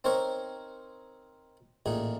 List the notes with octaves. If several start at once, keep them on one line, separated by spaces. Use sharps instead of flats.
C4 D#4 A#4 C5 C#5
A1 A#2 D#4 G#4